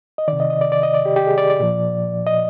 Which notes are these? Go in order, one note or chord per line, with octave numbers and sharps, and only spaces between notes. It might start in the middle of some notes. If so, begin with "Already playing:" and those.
D#5
D#3 D5
C3
D#5
D#5
D5
D5
D#5
D5
G4
G4
G#4
D5
D5
A#2 F3
D#5